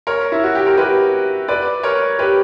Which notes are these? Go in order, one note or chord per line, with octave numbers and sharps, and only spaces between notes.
A#4 C#5
E4
F#4
G4
A#4
G4 B4
B4 D5
A#4 C#5
G4 B4